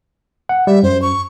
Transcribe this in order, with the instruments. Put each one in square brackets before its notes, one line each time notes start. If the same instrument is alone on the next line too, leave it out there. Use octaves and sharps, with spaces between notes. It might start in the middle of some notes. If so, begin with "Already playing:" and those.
[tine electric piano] F#5
[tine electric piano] G3 [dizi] E5
[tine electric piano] F#2 [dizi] C5
[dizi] C#6